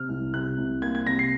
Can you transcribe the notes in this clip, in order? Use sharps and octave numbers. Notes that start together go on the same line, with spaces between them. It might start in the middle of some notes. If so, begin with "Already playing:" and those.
Already playing: C3 F6
C2
C3 F#6
C2
A#3 G#6
G#6
C3 A#6
C7